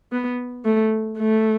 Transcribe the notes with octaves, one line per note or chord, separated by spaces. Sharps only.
B3
A3
A3